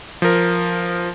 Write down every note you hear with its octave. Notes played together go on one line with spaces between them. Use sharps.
F3 A#4